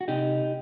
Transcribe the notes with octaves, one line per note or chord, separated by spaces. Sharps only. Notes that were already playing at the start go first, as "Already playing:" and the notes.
F#4
C3 D#4 G4